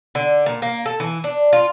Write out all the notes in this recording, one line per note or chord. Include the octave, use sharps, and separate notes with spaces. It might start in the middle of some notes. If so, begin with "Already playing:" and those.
D3
A#2
A#3
A4
E3
D4
F4